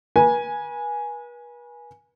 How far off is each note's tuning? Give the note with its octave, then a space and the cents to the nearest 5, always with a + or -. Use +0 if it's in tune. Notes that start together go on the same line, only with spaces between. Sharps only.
B4 -40 G#5 +0